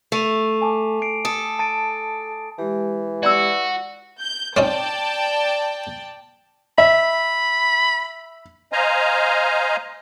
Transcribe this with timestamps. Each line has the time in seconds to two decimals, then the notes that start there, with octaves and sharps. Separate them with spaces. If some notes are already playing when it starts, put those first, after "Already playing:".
0.12 A3 C7 D#7 F7
0.62 G#5 A5 D6
1.02 C7 D7
1.25 A4 D#6
1.59 A5 A6 D7
2.58 E3 G#3 G4
3.23 F#4 D5 B5 E6
4.20 G6
4.57 C4 C#4 D#4 D5 G5 A5
6.78 E5 B5
8.72 C5 D#5 F5 G#5 A#5